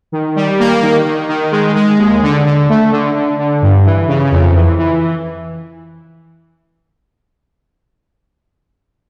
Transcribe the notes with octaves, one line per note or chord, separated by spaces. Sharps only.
D#3
G3
A#3
D#3
D#3
D#3
G#3
G#3
D#2
D3
D3
A3
D3
D3
D3
G2
E3
C#3
F2
E3
E3